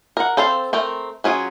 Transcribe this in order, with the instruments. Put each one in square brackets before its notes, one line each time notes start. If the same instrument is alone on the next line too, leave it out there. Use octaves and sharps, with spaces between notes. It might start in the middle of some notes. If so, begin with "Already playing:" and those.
[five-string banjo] A#4 F#5
C4 A4 C5 F5
A3 C4 A#4
F#3 C#4 F4 G#4